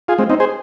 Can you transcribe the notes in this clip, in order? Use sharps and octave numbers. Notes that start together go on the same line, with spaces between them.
F4 G#4
G#3 C4
C4 D#4
G#4 C5